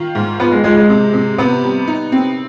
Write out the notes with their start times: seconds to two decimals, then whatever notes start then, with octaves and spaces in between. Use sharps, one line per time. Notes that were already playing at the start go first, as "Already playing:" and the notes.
Already playing: D#3 F4
0.15 G#2
0.40 F3 B3
0.52 G#3
0.64 F3 G#3
0.77 G#3
0.89 C3
1.13 C3
1.38 C3 B3
1.63 G3
1.88 D#4
2.12 C4